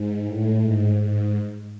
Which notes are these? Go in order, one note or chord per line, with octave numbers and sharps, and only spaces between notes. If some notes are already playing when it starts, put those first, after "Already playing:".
Already playing: G#2
A2
G#2
G#2